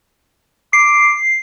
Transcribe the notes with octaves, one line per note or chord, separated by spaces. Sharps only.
D6 C7